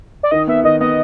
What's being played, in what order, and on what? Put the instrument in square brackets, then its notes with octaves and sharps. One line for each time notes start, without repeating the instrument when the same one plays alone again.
[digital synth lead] D5
[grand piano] D#3 [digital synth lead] D#5
[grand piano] B3 [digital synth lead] E5
[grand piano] D#3 [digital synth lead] D#5
[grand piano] B3 [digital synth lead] D#5